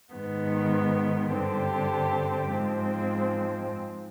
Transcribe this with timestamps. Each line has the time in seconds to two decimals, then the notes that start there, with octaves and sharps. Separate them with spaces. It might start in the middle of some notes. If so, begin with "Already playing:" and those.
0.13 G#2 D#3 B3
1.32 G2 D3 G3 C4 G4
2.50 G#2 F3 G#3 C4